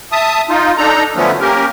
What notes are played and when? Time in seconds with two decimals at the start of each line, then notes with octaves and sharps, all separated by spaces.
0.12 E5 A5 D#6
0.49 D#4 F4
0.78 D4 D#4 A4 A#5
1.16 D3 F3 F#3 A3 B3 C#4
1.40 A#3 C#4 G4 A#4